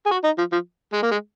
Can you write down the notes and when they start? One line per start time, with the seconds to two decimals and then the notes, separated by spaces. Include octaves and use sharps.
0.06 G#4
0.11 F#4
0.24 D#4
0.38 F3
0.52 F3
0.93 G#3
1.02 A#3
1.11 G#3